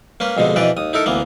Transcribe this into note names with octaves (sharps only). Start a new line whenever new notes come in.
A#3 C#4 B4
F2 B2 D3 G#3
F2 B2 E3 B4 D5
D#2 D#6
D#4 E4 A4 A#4
D2 E3 A#3 B3